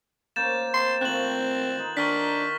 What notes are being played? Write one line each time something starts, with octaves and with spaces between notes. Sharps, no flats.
A#3 C#4 C5 G6 A6 E7
C4 C6
D#3 A3 C4 F4 F#6 F#7
D#4 B4 C6
D#3 D4 A#5 C#6 F6 B6